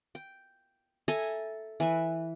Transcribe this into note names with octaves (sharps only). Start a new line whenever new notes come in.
G5
A4 E5 G#5 A#5
E3 B4 E5